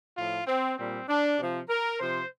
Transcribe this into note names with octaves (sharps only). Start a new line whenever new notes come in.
A2 F3 F4
C4
A#2 G3 C4
D4
C3 F3
A#4
C3 F3 C5